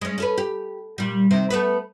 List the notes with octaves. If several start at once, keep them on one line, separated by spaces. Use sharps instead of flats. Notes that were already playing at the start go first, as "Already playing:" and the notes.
G#3 C#4
C#4 A4 B4
G4
A#2 G3
C3 D#3 C4
A3 B3 B4